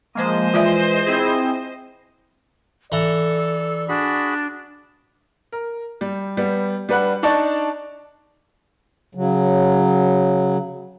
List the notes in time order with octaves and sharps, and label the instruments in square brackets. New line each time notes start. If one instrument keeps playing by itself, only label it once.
[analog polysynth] F3 G#3 A#3 [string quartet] C5 D#5
[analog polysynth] E3 G#3 [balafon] F4 D5 E5
[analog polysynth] C4 E4 G#4
[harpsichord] E3 A#5 [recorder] A4 [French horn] D5
[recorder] D4 [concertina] F#4 G#4 B5
[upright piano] A#4
G3
G3 B3
G3 D4 B4 F#5 B5 F#6
D4 D#4 D5 A5 C#6
[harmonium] C#3 F#3